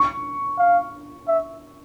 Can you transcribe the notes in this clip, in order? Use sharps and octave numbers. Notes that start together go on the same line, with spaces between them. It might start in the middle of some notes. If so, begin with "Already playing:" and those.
Already playing: C#6
F5
E5